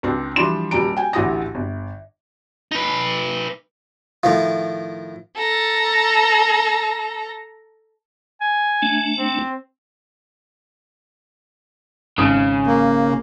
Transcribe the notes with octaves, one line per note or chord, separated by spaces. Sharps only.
C#2 C4 D4
E3 F3 G3 D4 C6 E7
D#1 G3 A#5 D7
G5 G#5
A1 D2 E4 G4 D#6 A#6
G1
D#4 B4
A2 D#3 F3 F5
A4 A#5
G#5
A3 D4
C4
G#1 C#3 D#6
A#3